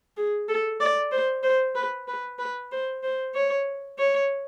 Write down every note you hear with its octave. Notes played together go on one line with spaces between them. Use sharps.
G#4
A4
D5
C5
C5
B4
B4
B4
C5
C5
C#5
C#5